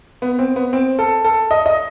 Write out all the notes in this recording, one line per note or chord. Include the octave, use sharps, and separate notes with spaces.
B3
C4
B3
C4
A4
A4
D#5
D#5